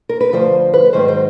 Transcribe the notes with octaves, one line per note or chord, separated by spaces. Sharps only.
A#4
B4
D2 C#3 F3 C5
B4
G#2 D#3 F#3 C5
C5